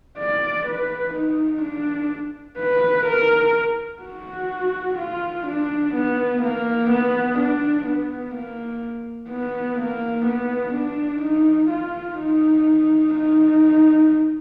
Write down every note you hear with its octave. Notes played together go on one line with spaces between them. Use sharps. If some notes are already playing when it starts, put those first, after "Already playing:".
D5
B4
D#4
D4
B4
A#4
F#4
F4
D4
B3
A#3
B3
D4
B3
A#3
B3
A#3
B3
D4
D#4
F4
D#4
D#4